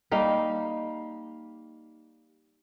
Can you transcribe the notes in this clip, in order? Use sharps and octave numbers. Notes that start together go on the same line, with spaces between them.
G3 A#3 D#4